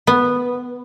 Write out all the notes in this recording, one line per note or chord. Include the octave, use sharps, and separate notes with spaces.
B3